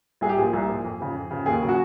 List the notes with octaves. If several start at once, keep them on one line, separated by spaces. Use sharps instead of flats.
C2 G#4
G4
A#2 F3 G#4
C2
A#2 F3
F2
C#3 F3
F2
C#3 F3
D#2 G#4
C#3 F#3
F#4